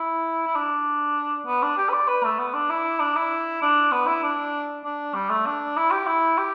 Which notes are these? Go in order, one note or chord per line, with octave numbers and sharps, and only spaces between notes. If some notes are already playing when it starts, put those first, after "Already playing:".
Already playing: E4
E4
D4
B3
D4
G4
B4
D5
B4
A3
B3
D4
E4
D4
E4
D4
B3
E4
D4
D4
G3
A3
D4
E4
G4
E4
G4